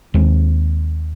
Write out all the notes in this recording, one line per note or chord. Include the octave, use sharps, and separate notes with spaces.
D#2 G#3 C4